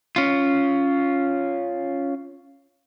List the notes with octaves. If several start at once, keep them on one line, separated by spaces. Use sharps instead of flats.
C#4 F4